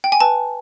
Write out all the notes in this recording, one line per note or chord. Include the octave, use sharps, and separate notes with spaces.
G5
G#5
B4 A5